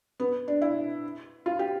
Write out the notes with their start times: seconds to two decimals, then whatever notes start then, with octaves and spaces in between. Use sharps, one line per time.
0.20 B3
0.48 D4
0.62 E4
1.46 F4
1.59 G4